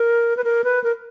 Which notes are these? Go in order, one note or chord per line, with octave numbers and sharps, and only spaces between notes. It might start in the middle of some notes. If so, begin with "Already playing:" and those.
Already playing: A#4
B4
A#4
B4
A#4